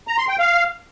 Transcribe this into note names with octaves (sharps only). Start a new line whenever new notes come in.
A#5
C6
G5
F5